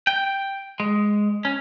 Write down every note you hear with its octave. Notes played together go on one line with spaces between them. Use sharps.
G5
G#3
C#4